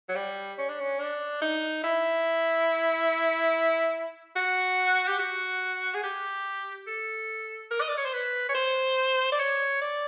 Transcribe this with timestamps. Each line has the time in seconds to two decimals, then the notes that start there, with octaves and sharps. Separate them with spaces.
0.09 F#3
0.16 G3
0.58 C#4
0.69 D4
0.80 C#4
0.99 D4
1.42 D#4
1.84 E4
4.36 F#4
5.08 G4
5.19 F#4
5.94 G#4
6.03 G4
6.87 A4
7.71 A#4
7.81 D#5
7.89 D5
7.97 C#5
8.05 C5
8.13 B4
8.49 C#5
8.55 C5
9.32 D5
9.39 C#5
9.81 D5